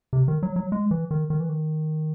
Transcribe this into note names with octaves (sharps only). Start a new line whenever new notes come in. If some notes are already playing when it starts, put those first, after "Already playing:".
C3
D#3
F#3
F#3
G#3
E3
D#3
D#3
E3
D#3